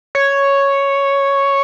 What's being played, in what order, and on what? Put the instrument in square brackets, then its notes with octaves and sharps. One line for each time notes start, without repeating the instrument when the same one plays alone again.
[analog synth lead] C#5